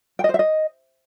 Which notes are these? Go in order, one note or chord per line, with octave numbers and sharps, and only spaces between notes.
G5
D#5
C5
E5
D#5